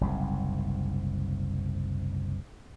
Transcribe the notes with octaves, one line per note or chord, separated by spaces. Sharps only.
F#1 C2 G#2